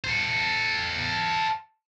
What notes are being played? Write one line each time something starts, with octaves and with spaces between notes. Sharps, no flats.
A4 C5